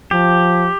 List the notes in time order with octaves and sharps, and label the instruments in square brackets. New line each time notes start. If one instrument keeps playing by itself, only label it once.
[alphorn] F3 [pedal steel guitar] G4